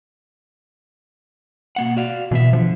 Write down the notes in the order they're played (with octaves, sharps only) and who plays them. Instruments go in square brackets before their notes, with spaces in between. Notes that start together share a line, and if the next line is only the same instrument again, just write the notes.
[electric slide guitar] B2 A#3 F#5
F#4 D5 F5
[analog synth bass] B2 [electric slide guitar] E3 B3 E5
[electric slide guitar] D3 [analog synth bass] F3